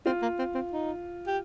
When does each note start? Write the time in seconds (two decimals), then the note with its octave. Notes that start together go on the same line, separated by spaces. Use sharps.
0.06 C4 F4
0.22 A#3
0.39 C4
0.55 C4
0.72 D#4
1.27 G4